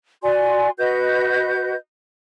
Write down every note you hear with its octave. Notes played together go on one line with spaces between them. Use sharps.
F#4 D5 G#5 C6
F#4 B4 D#5 G6